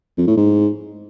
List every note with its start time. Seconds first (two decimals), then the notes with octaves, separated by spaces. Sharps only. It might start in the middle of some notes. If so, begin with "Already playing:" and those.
0.18 F2
0.27 A2
0.37 G#2